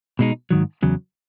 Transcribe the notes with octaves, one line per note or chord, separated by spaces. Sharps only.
B2 G#3 D#4
G#2 D#3 F#3
E2 C#3 F#3